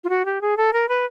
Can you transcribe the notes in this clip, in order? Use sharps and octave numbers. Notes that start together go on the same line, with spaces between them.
F4
F#4
G4
G#4
A4
A#4
B4